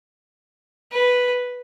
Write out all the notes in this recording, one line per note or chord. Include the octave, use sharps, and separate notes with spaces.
B4